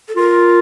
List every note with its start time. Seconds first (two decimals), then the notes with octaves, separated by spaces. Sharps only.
0.08 A4
0.16 F4 A#4